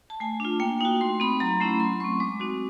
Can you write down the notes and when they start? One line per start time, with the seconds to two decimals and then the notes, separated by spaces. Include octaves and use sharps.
0.10 A5
0.20 A3 G#5
0.40 D4 F4
0.60 A#3 G5
0.81 D#4 F#4 G5
1.01 A3 C6
1.20 C4 D#4 B5
1.40 F#3 A#5
1.60 A3 C#4 E4 B5
1.80 F#3 C6
2.00 A3 C4 C#6
2.20 G#3 D6
2.40 C4 D#4 F#4